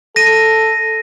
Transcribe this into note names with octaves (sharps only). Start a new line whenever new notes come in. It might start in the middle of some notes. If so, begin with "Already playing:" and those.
A4 A#6 D#7